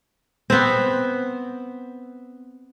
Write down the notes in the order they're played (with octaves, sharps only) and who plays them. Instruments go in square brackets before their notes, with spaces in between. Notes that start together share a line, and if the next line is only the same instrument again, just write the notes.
[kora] B3 C4